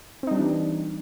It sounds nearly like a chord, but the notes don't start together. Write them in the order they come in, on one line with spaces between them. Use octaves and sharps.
C4 D#4 G3 D4 E3